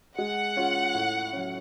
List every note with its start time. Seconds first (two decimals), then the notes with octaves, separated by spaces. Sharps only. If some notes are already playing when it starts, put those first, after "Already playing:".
0.18 G#3 F#5
0.56 C#4 F4 G#4
0.95 A2
1.33 F#3 C#4